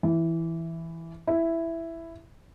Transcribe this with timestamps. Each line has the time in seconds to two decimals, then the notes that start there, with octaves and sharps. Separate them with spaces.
0.03 E3
1.27 E4